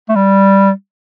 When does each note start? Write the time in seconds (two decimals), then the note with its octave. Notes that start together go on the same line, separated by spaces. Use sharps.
0.09 A3
0.16 G3